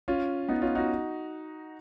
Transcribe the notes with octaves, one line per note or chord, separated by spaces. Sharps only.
C#4 F4
B3 D#4
C#4 F4
D#4 F#4